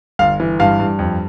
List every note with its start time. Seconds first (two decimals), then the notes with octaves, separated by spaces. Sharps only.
0.19 G1 F5
0.40 E3
0.60 G2 F5
0.80 G2
0.99 F2